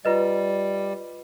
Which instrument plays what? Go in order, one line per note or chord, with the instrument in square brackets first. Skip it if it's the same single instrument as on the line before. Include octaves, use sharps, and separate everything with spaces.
[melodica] G3 [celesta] F4 B4 D#5